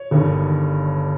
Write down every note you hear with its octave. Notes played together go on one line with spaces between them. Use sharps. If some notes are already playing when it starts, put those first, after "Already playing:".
Already playing: C#5
G1 G2 D#3